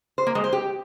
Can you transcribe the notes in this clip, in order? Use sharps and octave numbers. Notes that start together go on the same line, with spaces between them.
C5
A#3
G#3
C5
G4